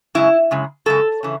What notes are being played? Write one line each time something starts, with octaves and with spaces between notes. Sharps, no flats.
F#2 C#3 G#3 E4
F#2 C#3 G#3
F#2 C#3 G#3 A4
C#3 E3